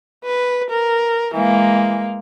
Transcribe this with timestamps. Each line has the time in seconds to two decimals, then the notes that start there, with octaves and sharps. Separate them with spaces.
0.24 B4
0.70 A#4
1.35 E3 G#3 A#3